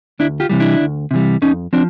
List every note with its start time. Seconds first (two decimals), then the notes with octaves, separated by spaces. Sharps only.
0.19 D2 D4 E4
0.40 F4 G4
0.49 C3 E3 G3
0.60 D4 E4
0.80 D2
1.11 C3 E3 G3
1.42 F2 C#4 D#4
1.73 F3 C4 D4